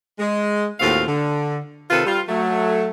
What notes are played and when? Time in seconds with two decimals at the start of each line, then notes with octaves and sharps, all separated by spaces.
0.19 G#3
0.80 D#2 A2 C4 F4 F#4 F5
1.07 D3
1.91 C3 D#3 F4 A4 B4
2.06 G3 F4
2.29 F#3 A3